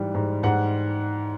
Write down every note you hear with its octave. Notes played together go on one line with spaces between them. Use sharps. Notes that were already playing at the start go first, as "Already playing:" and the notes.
Already playing: G#2 E3 G3
G#2
G#2 F#5